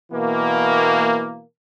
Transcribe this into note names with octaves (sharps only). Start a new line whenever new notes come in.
B2 E3 A#3